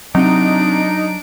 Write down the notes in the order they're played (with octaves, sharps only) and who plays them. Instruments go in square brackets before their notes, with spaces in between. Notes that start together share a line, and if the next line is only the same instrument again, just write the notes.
[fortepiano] C3 [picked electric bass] F#3 [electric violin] D4 D7 [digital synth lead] D#4